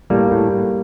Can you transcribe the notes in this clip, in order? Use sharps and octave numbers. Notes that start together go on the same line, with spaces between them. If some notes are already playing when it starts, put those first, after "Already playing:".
A2 G3 A#3
A2